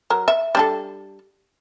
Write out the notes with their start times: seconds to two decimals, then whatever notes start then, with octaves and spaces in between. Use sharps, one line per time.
0.10 F#3 A#4
0.28 E5
0.55 G3 D4 A4